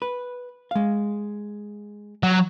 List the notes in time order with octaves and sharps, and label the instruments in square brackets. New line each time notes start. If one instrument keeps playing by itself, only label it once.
[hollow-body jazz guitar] B4
G#3 F5
[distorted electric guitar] F#3